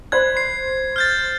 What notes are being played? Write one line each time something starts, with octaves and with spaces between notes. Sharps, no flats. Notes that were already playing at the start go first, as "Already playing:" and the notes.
C5 B5 F#6 G#6
C7
F6 G6 A6